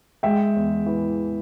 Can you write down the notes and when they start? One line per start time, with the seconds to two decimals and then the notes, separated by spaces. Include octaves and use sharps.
0.23 G#3 E5 G5
0.56 E2
0.86 E3